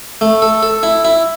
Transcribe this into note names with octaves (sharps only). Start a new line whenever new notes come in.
A3
A4
A4
E4
E4